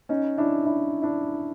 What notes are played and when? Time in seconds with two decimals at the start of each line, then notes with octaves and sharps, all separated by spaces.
0.09 C#4 D#4
0.37 D4 E4
0.66 D4 E4
1.02 D4 E4